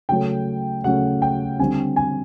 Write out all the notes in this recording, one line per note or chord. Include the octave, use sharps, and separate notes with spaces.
C#3 F#3 A3 C#4 G5
C#3 F#3 A3 C#4 F#5
G5
D3 G3 C4 G#5
G#5